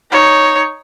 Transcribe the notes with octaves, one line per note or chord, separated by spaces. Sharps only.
D#4 C#5